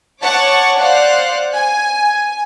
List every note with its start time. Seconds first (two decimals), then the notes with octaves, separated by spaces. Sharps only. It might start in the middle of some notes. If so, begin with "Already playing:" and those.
0.22 C#5 F#5 A5 C#6 D6
0.77 C5 D5 F5 F#5 F#6
1.53 G#5